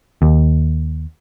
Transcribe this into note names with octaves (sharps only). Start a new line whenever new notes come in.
D#2